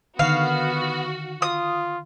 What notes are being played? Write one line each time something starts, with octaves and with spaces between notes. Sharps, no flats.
D3 D#3 B3 F#4 F5
F4 D#6